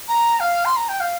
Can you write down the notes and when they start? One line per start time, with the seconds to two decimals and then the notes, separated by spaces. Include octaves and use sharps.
0.09 A#5
0.40 F5
0.65 C6
0.77 A#5
0.89 G5
1.00 F5